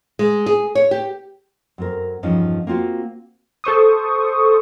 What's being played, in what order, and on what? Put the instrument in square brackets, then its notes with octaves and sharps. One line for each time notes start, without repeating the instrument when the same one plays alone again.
[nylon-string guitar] G#3
G#4
C#5
G4
F#2 C4 A#4
E2 G2 F3 C#4 D#4 F5
A#3 C4 F4 F#4
[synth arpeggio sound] A4 C5 C#6 D#6